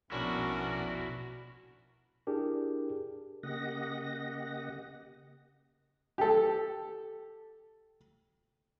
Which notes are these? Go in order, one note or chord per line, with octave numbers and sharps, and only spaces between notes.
A#1 B2 C#4 D4 E4 F#4 A#4
D4 E4 G4 G#4 A#4
C#3 A#3 G4 D#5 F#5 A#6
G4 A4